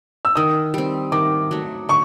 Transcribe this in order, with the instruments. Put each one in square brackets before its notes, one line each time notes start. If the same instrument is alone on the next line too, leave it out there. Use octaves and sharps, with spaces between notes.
[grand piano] E6
[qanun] D#3 [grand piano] D#6
[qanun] G3 C4
[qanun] D#3 [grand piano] D6
[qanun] F#3 A3
[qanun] D3 [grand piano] C#6